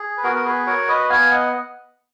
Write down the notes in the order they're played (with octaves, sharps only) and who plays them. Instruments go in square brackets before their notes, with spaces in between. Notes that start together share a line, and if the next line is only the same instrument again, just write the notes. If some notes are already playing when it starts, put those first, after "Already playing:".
Already playing: [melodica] G#4
B4
B3 F#4 A#4
A#4
G#4 B4
F#4 A#4 C#5
B4 D#5
B3 F5 G#5
D#5 F#5